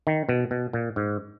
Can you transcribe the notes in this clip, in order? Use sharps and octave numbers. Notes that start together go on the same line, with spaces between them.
D#3
B2
B2
A#2
G#2